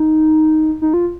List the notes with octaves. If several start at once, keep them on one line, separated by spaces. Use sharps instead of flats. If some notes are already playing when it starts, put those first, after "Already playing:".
Already playing: D#4
D#4
F4